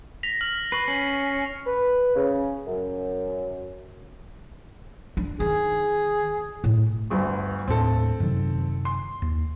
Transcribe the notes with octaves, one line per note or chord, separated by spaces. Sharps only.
A#6 B6 F7
F6 F#7
B4 C#6 C7
C#4
B4
C#3
F#2
D4
D#3 G#4
A2
G1 D2 G2
D#2 A2 C4 D4 A4
F#2 C3 D#3
C6
D#2